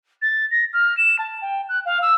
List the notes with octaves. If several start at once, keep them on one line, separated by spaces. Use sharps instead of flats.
A6
A#6
F6
E7
A5
G5
F#6
F5
E6